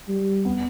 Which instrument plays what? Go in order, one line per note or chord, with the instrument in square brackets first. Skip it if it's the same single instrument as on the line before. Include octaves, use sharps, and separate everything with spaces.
[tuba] G3
[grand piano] B3